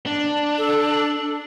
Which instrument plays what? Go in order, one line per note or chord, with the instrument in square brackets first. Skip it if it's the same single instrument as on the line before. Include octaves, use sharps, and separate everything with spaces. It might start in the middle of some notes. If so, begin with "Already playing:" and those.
[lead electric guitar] D4
[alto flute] A4